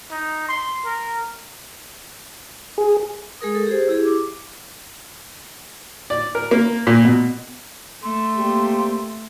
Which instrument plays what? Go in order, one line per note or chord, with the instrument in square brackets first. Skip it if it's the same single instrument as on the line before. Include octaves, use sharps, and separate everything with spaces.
[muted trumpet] D#4
C6
A#4
[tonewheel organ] G#4
[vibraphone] G#3 G#4 A#4 D#6
A4
G4 G#4 C5
E4 G4 G#4
D6
[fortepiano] D5
A#4
A#3
A#2
B2
[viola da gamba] A3 [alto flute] C6
[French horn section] C3 G3 G4 [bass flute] A#3